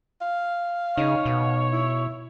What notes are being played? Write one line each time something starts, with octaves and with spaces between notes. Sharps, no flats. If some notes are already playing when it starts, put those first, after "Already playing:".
F5
C#3 D#4 C#5
B2
E4